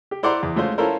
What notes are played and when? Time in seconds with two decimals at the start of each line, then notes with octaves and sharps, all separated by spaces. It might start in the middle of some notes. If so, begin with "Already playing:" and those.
0.11 G4
0.23 E4 C5 D5 F#5 A#5 C6
0.43 E2
0.56 G#3 A3 C#4 F4 C5
0.78 C#4 E4 F4 A4 A#4 C5